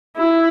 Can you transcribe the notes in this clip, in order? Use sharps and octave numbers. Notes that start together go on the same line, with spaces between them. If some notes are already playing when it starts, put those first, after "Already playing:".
E4